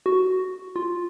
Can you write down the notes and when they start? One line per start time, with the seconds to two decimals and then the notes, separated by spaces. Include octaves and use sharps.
0.06 F#4
0.76 F4